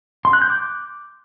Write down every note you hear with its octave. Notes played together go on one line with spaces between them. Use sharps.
C6
F#6
G6
D6